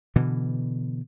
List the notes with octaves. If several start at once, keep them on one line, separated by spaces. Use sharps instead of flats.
B2 D3 E3